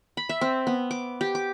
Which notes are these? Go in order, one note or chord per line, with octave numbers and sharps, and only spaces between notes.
B5
E5
C4
B3
D6
G4
D6